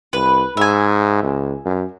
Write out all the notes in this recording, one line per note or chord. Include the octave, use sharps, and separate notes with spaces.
C2 B4
G#2 E5 G#5
C#2
F#2